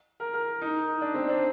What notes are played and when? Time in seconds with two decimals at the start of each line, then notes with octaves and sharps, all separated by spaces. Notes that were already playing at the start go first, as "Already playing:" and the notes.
0.20 A#4
0.34 A#4
0.61 D#4
1.01 D4
1.14 C4
1.29 D4